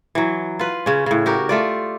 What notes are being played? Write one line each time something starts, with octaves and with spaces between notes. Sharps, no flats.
E3 F#3
F4 B4
C#3 C#4
A2 C#3
F#4 G4 A#4
A3 F4 D5